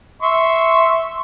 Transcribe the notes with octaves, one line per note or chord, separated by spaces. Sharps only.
E5 C6 C#6